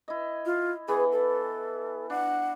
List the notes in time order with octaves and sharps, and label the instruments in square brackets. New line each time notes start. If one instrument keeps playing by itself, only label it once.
[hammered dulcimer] E4 D#5
[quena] F4
[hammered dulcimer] E3 B3 [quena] G#4
[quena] A4
[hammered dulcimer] D4 [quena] F#5